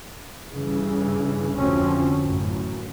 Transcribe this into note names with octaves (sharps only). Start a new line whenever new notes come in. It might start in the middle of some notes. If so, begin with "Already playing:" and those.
G2 C#3 E3
F1 D2 D3 F3 C4 C#4
A1 F#2